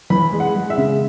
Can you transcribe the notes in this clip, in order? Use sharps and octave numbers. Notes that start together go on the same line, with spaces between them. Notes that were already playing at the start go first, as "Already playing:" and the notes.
E3 B5
G#3
F#5
G#3
E5
C#3